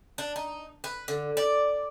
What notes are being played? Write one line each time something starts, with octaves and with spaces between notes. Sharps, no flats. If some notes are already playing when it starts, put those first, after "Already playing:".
D4
D#4
B4
D3
D5